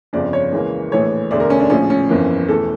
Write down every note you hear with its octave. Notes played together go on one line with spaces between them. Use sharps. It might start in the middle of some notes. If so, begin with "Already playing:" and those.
G1 F2 C#3 F3 D5
C#5
C#2 C#3 E3 A#3
A#1 A2 E3 A3 C#5
E1 D2 D3 A3 D5
A#4
C#4
D4
A#1 A2 F3 C#4
C#4
G1 F2 E3 A#3
E1 E2 E3 A3 A4